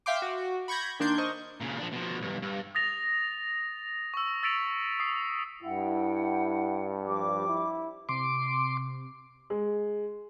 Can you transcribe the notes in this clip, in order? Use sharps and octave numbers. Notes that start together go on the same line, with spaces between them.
E5 F5 G5 C6 D6
F#4
B5 C#6 G6 G#6 A#6
D#3 A#3 D4 C6 G6 G#6
A#4 C5 D#5 C#6
A#2 C#3
F3 D4
B2 F3
B1 G2
G2
D#6 A6 A#6 F7
C#6 E6
E6 A6 B6 C#7 D7 F7
D#6 C7
G2 E4 F#5 G5
F3 G3 D6
E4
C3 C6 D6
G#3